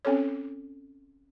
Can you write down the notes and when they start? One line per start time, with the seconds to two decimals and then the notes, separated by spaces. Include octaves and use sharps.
0.05 C4 C#4 A4 C#5